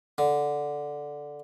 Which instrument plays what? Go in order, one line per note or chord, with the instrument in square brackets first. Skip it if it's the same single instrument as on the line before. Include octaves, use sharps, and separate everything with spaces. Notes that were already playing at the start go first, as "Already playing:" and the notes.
[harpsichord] D3